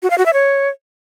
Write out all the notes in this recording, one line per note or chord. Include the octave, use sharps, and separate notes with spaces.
F#4
F5
F#4
E5
C#5